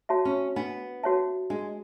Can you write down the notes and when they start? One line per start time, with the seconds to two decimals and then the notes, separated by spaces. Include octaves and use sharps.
0.09 F#4 C#5 E5 A5
0.25 C#4
0.56 B3 D4
1.03 F#4 C#5 E5 A5
1.50 G#3 D4